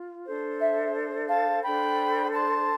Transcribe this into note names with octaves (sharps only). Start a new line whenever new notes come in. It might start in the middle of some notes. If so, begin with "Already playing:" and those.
Already playing: F4
D4 A4 C5
E5
F5 A5
D4 A4 C5 G5 B5
A5 C6